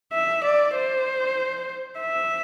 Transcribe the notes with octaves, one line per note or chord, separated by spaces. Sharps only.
E5
D5
C5
E5